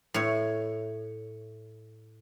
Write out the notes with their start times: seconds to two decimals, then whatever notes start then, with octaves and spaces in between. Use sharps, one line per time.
0.14 A2 C#5